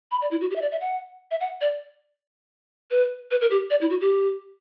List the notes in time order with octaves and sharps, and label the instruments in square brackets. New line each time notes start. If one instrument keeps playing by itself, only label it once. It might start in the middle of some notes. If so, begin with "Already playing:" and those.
[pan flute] B5
D5
E4
F#4
G4
E5
D5
E5
F#5
E5
F#5
D5
B4
B4
A#4
G4
D5
E4
F#4
G4